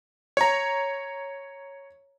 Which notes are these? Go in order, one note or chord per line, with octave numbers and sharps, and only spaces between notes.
C#5 A#5